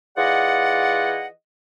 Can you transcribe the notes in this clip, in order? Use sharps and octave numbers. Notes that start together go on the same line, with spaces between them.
E3 F4 G#4 D5 D#5 F#5